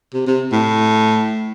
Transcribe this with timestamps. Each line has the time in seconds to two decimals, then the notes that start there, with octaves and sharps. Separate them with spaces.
0.14 C3
0.27 C3
0.52 A2